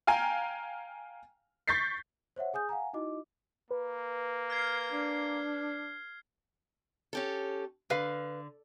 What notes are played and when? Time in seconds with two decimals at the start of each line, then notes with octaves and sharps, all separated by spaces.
0.07 F5 G5 G#5 A#5
1.68 C#6 G6 A6 B6 C7
2.36 C5 C#5 E5 F#5
2.53 G#4 G#5 D#6 G6
2.69 F5 F#5 G#5 A#5
2.93 D#4 E4 F#4 D#5 D6
3.71 A#3 B4
4.50 F6 G#6 C7
4.92 D4
7.13 C#4 G4 A4
7.90 D3 B4 F5